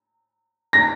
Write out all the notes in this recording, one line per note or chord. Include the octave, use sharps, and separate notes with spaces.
A#6